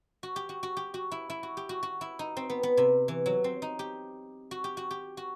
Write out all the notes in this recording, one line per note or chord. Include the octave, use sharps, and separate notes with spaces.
F#4
G4
F#4
F#4
G4
F#4
E4
E4
F#4
G4
F#4
F#4
E4
D#4
C4
B3
B3
C3
E3
F#3
C4
D#4
G4
F#4
G4
F#4
G4
F#4